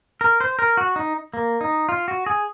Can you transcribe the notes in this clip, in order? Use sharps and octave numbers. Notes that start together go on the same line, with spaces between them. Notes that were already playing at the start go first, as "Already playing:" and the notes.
A#4
C5
A#4
F#4
D#4
A#3
D#4
F4
F#4
G#4